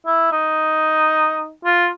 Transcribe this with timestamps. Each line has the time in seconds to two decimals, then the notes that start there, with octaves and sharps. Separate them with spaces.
0.06 E4
0.32 D#4
1.64 F4